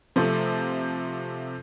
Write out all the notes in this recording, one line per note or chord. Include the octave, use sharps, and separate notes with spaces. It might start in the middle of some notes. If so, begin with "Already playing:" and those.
C3 F3 A3 C4